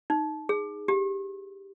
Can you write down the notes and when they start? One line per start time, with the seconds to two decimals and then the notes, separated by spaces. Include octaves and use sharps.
0.10 D#4
0.49 G#4
0.88 G4